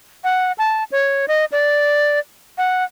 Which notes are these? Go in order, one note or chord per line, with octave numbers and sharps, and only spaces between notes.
F#5
A5
C#5
D#5
D5
F#5